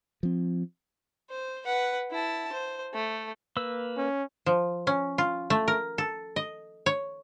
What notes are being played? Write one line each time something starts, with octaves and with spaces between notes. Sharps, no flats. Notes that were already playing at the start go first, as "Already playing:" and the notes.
F3 C4
C5
B4 F#5
E4 A5
C5
A3
A#3 B4 E6
C#4
F3
C#4
F4
A3
A#4
A4
D#5
C#5